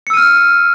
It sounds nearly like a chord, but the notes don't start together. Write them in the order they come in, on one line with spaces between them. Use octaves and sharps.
C#7 E6 D#7 F6